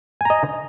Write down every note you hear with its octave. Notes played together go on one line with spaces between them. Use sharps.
D#5 G#5 A#5